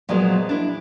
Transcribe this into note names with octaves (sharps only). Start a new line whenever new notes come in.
A#2 F3 F#3 G#3 A#3 B3
D4 E4